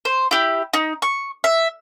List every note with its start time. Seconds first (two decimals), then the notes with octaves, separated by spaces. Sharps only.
0.05 C5
0.31 E4 G4
0.73 D#4
1.02 C#6
1.44 E5